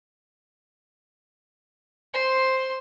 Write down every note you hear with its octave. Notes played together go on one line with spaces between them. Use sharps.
C5 C6